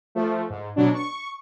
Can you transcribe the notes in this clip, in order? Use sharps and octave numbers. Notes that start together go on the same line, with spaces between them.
F3 A3
G#2
B2 F#3 D4
C#6